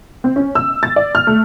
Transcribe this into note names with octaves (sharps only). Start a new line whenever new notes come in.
C4
C#4
E6
A6
D5
F6
A3